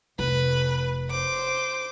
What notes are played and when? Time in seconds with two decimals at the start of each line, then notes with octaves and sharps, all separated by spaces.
0.19 F1 B4
1.10 C5 D6